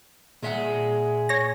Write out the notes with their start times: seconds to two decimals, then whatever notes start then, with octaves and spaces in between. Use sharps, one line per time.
0.42 A#2 G#3 E5 F#5
1.29 C#5 A#6